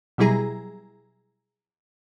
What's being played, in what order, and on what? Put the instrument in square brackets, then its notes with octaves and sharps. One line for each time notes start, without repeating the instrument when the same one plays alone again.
[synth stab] B2 F#3 G3 E4 G#4 A#5